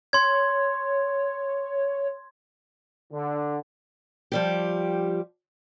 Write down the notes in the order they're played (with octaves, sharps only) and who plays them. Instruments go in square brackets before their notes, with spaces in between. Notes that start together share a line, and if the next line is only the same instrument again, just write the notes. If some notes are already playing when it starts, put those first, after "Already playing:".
[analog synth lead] C#5 [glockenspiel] C6 G#6
[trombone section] D3
[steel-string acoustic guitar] F3 G3 G4